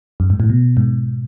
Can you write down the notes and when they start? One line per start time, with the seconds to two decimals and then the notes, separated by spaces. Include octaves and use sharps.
0.20 F#2
0.30 G#2
0.40 A2
0.50 B2
0.77 G#2